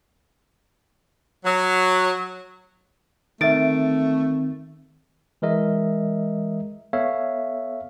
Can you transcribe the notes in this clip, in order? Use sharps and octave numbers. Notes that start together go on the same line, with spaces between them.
F#3
D#3 A3 C4 E5 A6 D7
E3 G#3 A#4 D#5 E5
B3 A4 C#5 E5 F5